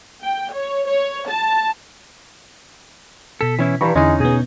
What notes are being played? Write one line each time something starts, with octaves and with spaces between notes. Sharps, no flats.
G5
C#5
C#5
A5
B2 A4 B6
E3 C#4 E4
G2 D#3 E3 A#5 B5 C#6
E2 D3 G#3 C#4 D#4 E4
B2 B3 G#4